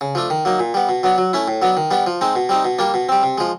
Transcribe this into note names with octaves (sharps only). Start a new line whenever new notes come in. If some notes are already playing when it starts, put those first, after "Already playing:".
C#3
F3 A3 D4
D#3
F#3 A#3 D#4
A#2
G3 B3
B2
F#3 B3 D4
F#3
A3 C#4 E4
A2
F#3 B3 D4
D#3
G3 B3 D4
F3
G#3 C4 D#4
B2
G3 C4 D#4
B2
G3 A#3 D4
B2
G3 C4
C3
F3 G#3